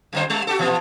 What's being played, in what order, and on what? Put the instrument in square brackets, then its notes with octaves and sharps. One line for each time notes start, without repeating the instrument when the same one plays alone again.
[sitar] F#2 D3 C5
G3
F#4 G4 A4
A#2 E3 F3